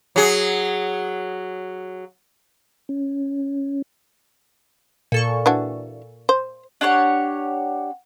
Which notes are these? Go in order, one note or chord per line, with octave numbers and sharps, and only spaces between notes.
F#3 G#4
C#4
A#2 A4 C#6
E3 D4 F#4
C5
D4 G4 C#5 F#5